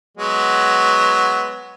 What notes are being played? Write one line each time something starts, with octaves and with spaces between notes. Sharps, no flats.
F#3 G#3 B3